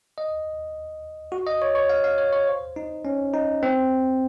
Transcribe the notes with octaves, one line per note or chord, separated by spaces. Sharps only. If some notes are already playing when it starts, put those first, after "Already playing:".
D#5
F#4
D#5
C#5
C#5
F5
F5
C#5
C#5
C5
D#4
C#4
D#4
C4